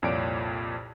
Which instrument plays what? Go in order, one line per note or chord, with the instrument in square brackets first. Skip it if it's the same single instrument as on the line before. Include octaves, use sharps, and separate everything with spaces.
[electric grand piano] C2 F2 A#2 C#5 D5 D7